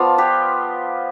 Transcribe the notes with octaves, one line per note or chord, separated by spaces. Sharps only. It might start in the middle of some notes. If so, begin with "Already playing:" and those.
Already playing: F3 B3 F4 D5 F5
G4 B4